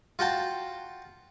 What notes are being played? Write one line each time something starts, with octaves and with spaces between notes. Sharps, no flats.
F4 F#4 G5 A5